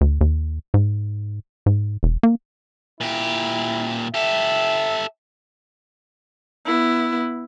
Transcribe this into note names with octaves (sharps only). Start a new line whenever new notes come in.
D2
D#2
G#2
G#2
E1
A#3
A#2 E4 G4
G4 A4 E5
B3 E4